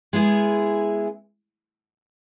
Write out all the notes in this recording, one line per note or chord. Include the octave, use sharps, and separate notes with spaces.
G#3 B3 E4 G#4